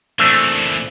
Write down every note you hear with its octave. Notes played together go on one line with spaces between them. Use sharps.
A#2 E3 A3 C4 D4